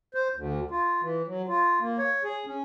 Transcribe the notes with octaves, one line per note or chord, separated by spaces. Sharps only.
C5
D2
F4
E3
F#3
F4
A#3
C#5
G#4
C#4